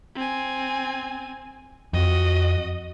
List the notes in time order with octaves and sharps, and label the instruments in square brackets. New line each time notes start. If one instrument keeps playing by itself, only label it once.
[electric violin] C4 G#5
[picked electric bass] F2 [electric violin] F#4 D#5